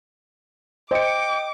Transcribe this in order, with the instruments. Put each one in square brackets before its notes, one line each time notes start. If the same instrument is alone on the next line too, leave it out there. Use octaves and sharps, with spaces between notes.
[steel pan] C5 [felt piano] D#5 C#7 [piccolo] G5 [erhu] D6